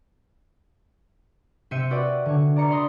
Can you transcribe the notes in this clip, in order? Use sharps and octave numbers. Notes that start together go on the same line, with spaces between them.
C3 C4 E5 G6 C#7 D#7
F#4 B4 D5 G5
D3 C#5
D5 A#5 C#7
D5 B5 C6 D#6 A#6